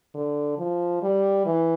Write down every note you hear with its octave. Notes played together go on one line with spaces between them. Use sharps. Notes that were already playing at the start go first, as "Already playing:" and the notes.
D3
F3
G3
E3